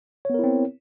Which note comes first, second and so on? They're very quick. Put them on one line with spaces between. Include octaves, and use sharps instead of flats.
C#5 B3 A#4 E4 C4